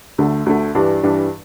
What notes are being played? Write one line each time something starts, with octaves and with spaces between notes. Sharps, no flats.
D2 D3 A3
D2 D3 A3
G2 E3 G3 D4
G2 E3 G3 D4